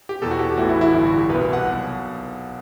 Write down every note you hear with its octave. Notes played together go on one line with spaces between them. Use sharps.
G4
E2 B2 A4
F#4
G4
A1 A2 E3 F#4
E4
E4
A1 G2 D3 E4
F#4
G4
C2 B2 B4
F#5
B1 B2